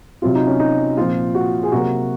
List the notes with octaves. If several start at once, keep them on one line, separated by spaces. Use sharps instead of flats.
C3 F#3 C4 F4
D#4
C#4
D#4
A#2 F3 C4 F4
F#4
G#4
C3 F#3 A#3 F#4